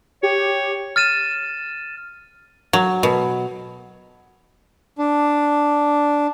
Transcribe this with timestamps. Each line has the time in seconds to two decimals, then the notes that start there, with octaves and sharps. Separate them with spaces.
0.23 G4 C#5
0.96 F6 A6 D#7 E7
2.73 F#3
3.03 B2
4.98 D4